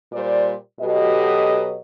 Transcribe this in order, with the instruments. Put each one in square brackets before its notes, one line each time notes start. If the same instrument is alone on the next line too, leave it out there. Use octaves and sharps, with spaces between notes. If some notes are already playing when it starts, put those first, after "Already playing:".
[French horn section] A#2 G3 C5 D5
B2 F#3 G4 A4 B4 D#5